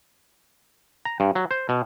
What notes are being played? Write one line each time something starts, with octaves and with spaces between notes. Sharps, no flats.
A#5
G2
F#3
C5
B2